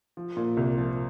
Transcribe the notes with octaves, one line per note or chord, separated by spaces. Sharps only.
F3
A#2
C2
F3